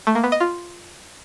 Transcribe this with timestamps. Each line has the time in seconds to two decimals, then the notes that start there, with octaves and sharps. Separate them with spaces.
0.07 A3
0.15 A#3
0.24 B3
0.32 D#5
0.40 F4